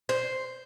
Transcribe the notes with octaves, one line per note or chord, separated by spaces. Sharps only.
C5